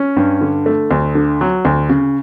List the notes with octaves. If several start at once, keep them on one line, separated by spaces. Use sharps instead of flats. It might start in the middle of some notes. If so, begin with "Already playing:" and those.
Already playing: C#4
G2
D3
A3
D2
D3
F#3
D2
C#3